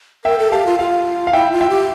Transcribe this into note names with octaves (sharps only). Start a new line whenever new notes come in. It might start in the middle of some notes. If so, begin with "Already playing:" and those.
A#4 E5 G5
A4
G4 F5 A5
F4
F4 F5
F5
E4 E5 G5
F4
E5 G5
G4